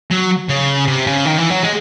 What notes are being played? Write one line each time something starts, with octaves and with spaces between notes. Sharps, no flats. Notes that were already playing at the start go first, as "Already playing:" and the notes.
F#3
C#3
C3
C#3
D#3
E3
F#3
G#3